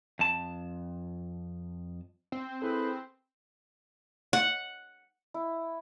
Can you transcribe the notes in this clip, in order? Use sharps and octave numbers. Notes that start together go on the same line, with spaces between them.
F2 A5
C4
E4 G#4 A4 B4 C5
F#5
E4